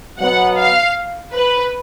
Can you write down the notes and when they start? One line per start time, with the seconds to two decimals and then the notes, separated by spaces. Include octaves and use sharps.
0.19 B2 F#3 B3 F#5
0.58 F5
1.34 B4